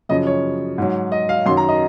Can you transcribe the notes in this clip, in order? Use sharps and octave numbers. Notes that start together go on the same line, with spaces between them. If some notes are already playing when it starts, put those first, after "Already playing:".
F#2 C#3 F3 D#5
C#5
G#2 F#3
D#5
F5
F#2 D#3 F#3 C6
A#5
D#5